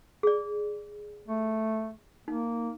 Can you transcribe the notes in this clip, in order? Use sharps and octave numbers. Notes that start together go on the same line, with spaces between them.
G#4 D5
A3
A#3 D#4